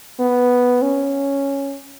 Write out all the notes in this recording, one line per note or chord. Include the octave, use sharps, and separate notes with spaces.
B3
C#4